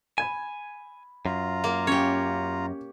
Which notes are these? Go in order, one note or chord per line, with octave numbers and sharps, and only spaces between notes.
G#5 B5 G#6 E7
F#2 F4 A#5
A#3
C#4 G4 C#5